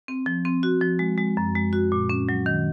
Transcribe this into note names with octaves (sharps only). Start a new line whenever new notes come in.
C4
F3
C4
F#4
F3
G#3
G#3
F#2
G#3
F#4
A#2
C#4
F#3
D#3